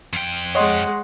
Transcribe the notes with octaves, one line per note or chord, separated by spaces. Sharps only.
F2 G5
G#3 C#5 D#5 F#5 C6